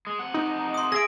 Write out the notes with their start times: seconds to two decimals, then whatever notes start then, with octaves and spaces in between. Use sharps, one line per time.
0.07 G#3
0.19 C3 F#5
0.34 D#4
0.74 C6 D#6
0.92 G#4 D#5 E5 A#6 D7